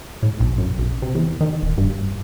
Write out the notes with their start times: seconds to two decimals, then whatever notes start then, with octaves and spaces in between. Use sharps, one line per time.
0.23 A2
0.40 B1
0.58 F#2
0.79 B1
1.02 C3
1.15 E2
1.41 D#3
1.62 D#1
1.78 G2